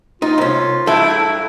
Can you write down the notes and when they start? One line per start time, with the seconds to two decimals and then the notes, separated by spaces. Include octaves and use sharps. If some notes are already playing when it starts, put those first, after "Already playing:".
0.22 D#4 F4
0.38 C2 C#4
0.87 G2 A3 E4 A4